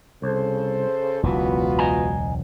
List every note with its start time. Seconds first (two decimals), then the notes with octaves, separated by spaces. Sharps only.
0.22 C2 C#3 A4 C5
1.23 E1 C#2 E3 F#3 B3 F4 F#4
1.79 D#5 G#5 A#5